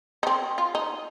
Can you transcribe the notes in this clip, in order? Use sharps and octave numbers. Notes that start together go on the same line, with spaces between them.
D#4
C4
F4
D#4